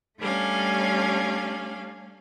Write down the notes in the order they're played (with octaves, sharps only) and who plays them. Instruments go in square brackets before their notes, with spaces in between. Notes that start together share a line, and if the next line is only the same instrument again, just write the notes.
[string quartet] G3 A3 C#4 D4 F5